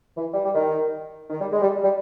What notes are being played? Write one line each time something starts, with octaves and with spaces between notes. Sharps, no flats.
E3
G3
G3
D#3
D#3
G3
G#3
G3
G3